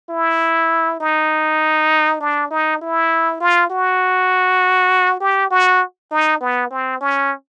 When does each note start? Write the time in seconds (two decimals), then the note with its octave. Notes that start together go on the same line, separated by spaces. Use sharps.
0.10 E4
1.01 D#4
2.21 D4
2.51 D#4
2.81 E4
3.40 F4
3.70 F#4
5.20 G4
5.51 F#4
6.11 D#4
6.41 B3
6.71 C4
7.01 C#4